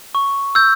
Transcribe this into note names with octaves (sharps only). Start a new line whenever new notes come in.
C#6
E6 G6